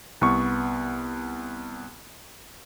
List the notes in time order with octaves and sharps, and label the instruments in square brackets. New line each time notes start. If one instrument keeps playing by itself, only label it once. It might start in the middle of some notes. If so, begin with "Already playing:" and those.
[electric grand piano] C2 B3 C#6